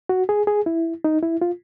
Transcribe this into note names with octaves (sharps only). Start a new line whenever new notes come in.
F#4
G#4
G#4
E4
D#4
E4
F4